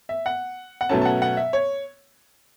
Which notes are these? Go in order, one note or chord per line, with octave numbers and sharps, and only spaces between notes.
E5
F#5
F#5
B2 F#3 A3 C#4 A5
A5
F#5
F#5
E5
C#5